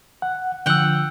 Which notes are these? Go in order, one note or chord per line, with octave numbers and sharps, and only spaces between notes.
F#5
D3 F3 F#5 G5 E6